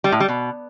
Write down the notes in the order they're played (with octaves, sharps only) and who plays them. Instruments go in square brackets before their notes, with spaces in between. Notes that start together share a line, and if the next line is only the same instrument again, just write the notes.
[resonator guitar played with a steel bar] G3
A2
G3
B2